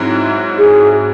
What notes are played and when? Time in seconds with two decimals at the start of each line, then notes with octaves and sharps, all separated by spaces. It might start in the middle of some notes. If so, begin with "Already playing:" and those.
Already playing: G#2 F#3 C4 E4
0.58 G#4